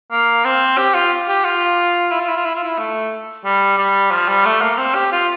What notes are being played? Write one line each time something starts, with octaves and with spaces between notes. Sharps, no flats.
A#3
C4
G4
F4
G4
F4
E4
F4
E4
F4
E4
F4
E4
A3
G3
G3
F3
G3
A3
A#3
C4
G4
F4